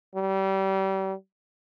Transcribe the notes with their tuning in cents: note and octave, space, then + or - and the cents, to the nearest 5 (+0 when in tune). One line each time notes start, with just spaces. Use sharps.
G3 -30